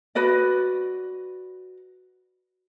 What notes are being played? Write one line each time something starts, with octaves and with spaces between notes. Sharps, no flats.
F#4 B4 D5 D#5